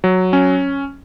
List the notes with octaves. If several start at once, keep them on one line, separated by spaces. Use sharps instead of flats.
F#3
C#4